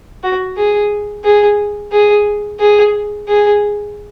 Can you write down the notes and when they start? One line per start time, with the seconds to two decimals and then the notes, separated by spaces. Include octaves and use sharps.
0.23 F#4
0.57 G#4
1.24 G#4
1.92 G#4
2.60 G#4
3.28 G#4